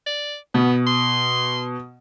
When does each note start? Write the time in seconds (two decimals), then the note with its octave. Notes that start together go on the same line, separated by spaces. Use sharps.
0.07 D5
0.54 B2 B3
0.87 C6